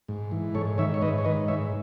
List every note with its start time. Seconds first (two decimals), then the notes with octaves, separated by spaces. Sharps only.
0.08 G#2
0.31 E3
0.55 G#2 A4 C#5
0.78 D#3 C#5 E5
0.94 C#5
1.02 G#2 B4 D#5
1.18 C#5
1.25 D#3 B4 D#5
1.48 G#2 C#5 E5